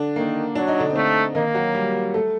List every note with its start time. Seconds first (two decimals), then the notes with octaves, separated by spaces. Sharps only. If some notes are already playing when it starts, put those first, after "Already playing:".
Already playing: D3 D4
0.16 D#3 A#3
0.55 F#3 D4
0.68 D#4
0.80 D3 D4
0.90 C4
0.95 D3 A3 D4
1.35 D#3 A#3 D#4
1.55 F#3 F#4
1.75 G3 G4
2.14 A3 A4